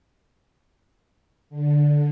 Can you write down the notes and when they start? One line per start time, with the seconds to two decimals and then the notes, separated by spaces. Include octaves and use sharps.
1.50 D3